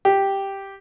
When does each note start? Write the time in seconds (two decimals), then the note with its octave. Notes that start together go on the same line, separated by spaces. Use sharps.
0.05 G4